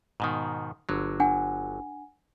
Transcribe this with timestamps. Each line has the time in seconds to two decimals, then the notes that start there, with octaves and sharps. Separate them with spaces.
0.20 G#2 B2 D#3
0.89 G1 D3 F#3
1.20 D4 F#5 G#5